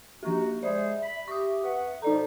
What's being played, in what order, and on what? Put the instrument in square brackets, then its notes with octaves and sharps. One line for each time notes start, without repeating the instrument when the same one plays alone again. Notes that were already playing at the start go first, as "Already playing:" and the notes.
[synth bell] F3 G4 [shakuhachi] A#3 [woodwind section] D#4 F#4
[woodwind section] G#3 G#4 C5 [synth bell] D5 [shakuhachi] E5
[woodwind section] B5
[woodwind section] G4 [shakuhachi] E5 [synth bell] C#6 D#6
[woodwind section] F2 B4 F#5
[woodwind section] B2 F3 [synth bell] D#4 D5 A#5 [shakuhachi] A4